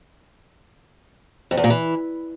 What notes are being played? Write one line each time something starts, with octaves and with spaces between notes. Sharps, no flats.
F2
E2
A#2
E3